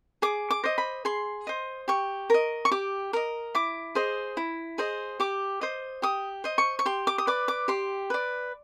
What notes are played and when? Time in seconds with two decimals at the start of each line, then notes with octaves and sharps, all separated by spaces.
0.22 G#4 D6
0.50 D6
0.64 C5 D#5
0.78 B5
1.05 G#4 C6
1.47 C5 D#5
1.88 G4 C#6
2.30 A#4 D#5
2.65 C#6
2.71 G4 D6
3.13 A#4 D#5
3.55 E4 D6
3.95 G#4 C5 D#5
4.37 E4
4.78 G#4 C5 D#5
5.20 G4 D6
5.61 C5 D#5
6.02 G4 D#6
6.44 C5 D#5
6.58 C#6
6.79 C#6
6.86 G4 C6
7.07 D6
7.18 D#6
7.27 B4 D5 D6
7.48 D6
7.68 G4 C6
8.10 B4 D5